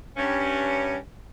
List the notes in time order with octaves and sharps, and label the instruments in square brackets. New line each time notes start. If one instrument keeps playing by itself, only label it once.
[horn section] G2 C#4